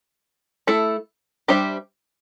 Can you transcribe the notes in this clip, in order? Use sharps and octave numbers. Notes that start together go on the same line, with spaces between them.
A3 E4 A4
G3 D4 G4 C5 E5